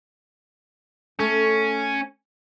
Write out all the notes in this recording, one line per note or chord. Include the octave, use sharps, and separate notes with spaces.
A3 C#4 A4